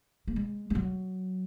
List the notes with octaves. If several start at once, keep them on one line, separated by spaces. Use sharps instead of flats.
A#3
G#3
G#3
F#3